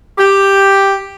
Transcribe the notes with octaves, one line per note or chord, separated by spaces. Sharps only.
G4